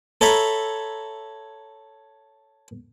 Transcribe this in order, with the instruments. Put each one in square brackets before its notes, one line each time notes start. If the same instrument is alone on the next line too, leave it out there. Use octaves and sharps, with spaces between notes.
[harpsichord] A4 C#5 E5 A#5 B5